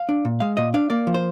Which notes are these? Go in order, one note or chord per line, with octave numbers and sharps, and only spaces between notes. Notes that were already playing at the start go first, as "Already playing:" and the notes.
Already playing: F5
D4
A#2
G#3 F5
A#2 D#5
D4 F5
A#3 D5
F3
C5